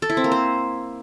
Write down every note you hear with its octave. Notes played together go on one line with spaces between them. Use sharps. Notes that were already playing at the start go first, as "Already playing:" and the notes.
A4
E4
C4
A#3
C5